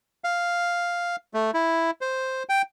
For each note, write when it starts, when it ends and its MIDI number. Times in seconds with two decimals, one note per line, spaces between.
0.24 1.16 77
1.34 1.51 57
1.54 1.91 64
2.01 2.43 72
2.49 2.62 79